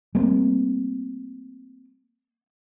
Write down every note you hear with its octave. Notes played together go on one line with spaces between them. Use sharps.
G3 A3 A#3 C4